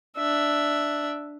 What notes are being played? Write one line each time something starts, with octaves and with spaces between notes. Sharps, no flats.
D4 E5